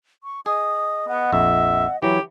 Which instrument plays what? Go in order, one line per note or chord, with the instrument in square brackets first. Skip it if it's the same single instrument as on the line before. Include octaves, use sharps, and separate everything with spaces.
[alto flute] C#6
[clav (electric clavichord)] G#4 [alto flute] D#5 [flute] D#6
[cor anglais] B3 [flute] F#5
[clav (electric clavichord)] A#1 F2 [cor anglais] E5
[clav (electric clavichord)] E3 F#3 [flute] E4 [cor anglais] G4 [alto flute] C#5